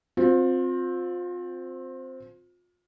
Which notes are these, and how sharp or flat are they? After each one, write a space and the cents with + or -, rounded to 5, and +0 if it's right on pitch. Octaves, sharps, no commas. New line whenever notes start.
C4 +0 F4 +30